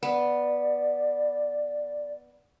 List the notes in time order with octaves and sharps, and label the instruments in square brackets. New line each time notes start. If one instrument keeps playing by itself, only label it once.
[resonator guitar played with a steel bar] B3 [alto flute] D5